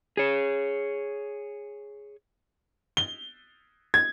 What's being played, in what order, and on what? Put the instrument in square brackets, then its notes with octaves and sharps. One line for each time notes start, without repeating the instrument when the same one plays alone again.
[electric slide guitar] G#4 C#5
[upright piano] G7
G#6